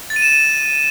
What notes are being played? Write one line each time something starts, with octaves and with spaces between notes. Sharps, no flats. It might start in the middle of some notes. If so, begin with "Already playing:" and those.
A6
D#7
E7
D#7